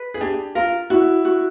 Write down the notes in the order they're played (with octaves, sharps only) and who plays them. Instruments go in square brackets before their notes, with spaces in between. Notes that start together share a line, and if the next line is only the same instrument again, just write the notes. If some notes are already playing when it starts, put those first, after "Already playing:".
Already playing: [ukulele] B4
[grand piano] G#4
[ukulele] D4 [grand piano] G4
[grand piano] F4 [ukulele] A#4
[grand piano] E4 [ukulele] F#4
[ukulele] F#4